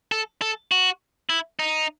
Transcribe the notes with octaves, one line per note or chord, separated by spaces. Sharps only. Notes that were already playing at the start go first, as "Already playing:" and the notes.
A4
A4
F#4
E4
D#4